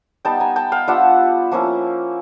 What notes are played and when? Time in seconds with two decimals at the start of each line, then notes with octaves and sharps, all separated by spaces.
0.25 G3 B3 D#4 G5 A5
0.40 G#5 A#5
0.56 G5 A5
0.72 F5 G5
0.87 G3 B3 D4 F4 E5 F#5
1.51 F3 A#3 C#4 E4